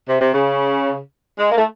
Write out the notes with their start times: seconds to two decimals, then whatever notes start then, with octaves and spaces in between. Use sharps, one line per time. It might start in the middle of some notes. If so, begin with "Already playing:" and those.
0.08 C3
0.21 C3
0.34 C#3
1.38 G#3
1.51 A#3
1.58 A3